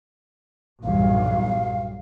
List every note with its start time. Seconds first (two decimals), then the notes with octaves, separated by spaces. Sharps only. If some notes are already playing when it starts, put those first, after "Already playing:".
0.84 B1 E2 G2 A#2 E3 G3 F5